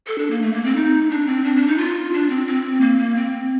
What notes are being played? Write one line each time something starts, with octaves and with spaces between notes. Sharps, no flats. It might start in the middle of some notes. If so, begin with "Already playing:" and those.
A4
D4
A#3
A3
A#3
C4
D#4
D4
C4
D4
D4
D#4
F4
D4
C4
C4
A#3
A#3
C4